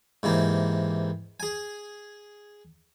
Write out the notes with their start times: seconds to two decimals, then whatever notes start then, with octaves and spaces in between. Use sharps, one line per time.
0.23 G#2 C3 E3 A#3
1.40 G#4 G#5